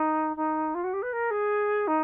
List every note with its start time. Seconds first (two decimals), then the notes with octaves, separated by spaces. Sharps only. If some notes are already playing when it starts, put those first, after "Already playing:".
Already playing: D#4
0.36 D#4
0.74 F4
0.83 F#4
0.93 G4
1.02 B4
1.12 A#4
1.30 G#4
1.87 D#4